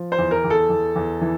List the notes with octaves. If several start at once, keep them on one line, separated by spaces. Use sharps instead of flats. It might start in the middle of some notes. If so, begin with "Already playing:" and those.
Already playing: F3
C5
E2
A#4
E2
A4
E2
E2
E3